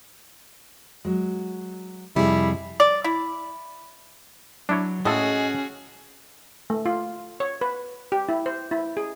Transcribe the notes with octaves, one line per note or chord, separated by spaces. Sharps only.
F#3 G#3
F2 C3 G3 E4 G#4
D5
E4
F#3 D4 E4 C#5
A2 G#3 C#4 F#4 G#4 A4 D#5
A3
F4
C#5
B4
G4
E4
C5
E4
G#4